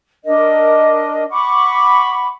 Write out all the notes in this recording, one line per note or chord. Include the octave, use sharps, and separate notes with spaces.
D4 A#4 D#5
F#5 B5 C#6 D6